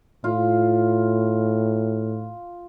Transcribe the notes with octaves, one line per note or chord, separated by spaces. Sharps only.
A2 F4